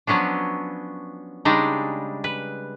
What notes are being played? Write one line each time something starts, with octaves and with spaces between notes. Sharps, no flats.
F3 F#3 B3 C#4 D4
C#3 G3 G#3 D4 D#4
B4